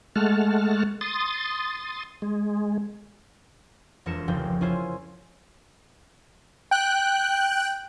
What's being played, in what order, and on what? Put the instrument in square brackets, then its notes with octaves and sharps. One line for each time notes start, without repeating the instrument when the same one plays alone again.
[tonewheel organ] G#3 A3 F#5 A5 F6
C6 D#6 A6
G#3
[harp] E1 F2 A#4 C#7 E7
F1 C#2 F3 G5
C#4 E4 F4 C5 G#5
[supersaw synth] G5 F#6